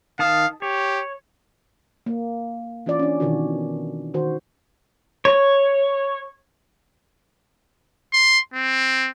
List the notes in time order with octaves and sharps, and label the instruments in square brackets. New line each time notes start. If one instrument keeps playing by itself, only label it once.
[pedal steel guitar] D#3 A5 D#6 [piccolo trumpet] F5
[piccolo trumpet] G4 [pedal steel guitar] C#5
[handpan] A#3
E3 C#4 F4 D5
C#4 D4
B2 D#3 E3 F#4
D#3 F#4 C5
[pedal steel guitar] C#5
[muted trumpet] C6
C4